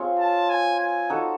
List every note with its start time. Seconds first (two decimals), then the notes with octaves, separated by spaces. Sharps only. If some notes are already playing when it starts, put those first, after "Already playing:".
Already playing: C4 F4 G#4 C#5
0.19 A5
0.50 G#5
0.80 G#5
1.10 D#4 F#4 A4